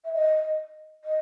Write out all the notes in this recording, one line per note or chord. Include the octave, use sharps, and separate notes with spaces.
E5
D#5
D#5